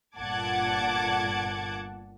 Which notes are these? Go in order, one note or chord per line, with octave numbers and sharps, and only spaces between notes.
G1 A#2 F#5 A5 D6 G#6